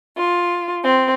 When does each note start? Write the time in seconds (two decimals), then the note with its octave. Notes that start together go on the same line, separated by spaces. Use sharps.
0.17 F4
0.84 C4